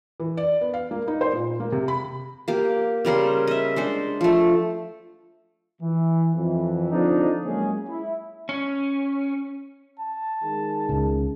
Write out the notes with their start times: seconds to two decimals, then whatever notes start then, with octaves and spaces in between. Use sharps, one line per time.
0.20 E3
0.37 D5
0.61 B3
0.74 F5
0.91 A#3
1.08 D#4
1.21 C5
1.33 A#2
1.60 A#3
1.72 C3
1.88 B5
2.48 A#3 G4
3.05 C#3 G3 A#4 C5
3.47 D#5 E5
3.76 G#3 D4 C5
4.21 F3 A3
5.82 E3
6.35 F2 E3
6.91 D3 F3 C4 D4 D#4
7.45 F#2 G#3 A#3 C#4 G#4
7.89 E4
8.49 C#4
10.00 A5
10.44 D#3 G#3 G#4
10.89 C#2 C#3